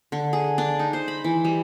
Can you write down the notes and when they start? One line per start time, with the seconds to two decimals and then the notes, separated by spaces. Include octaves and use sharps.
0.12 D3
0.33 G#4
0.58 D4
0.79 D#4
0.93 C5
1.08 B5
1.24 E3
1.45 G3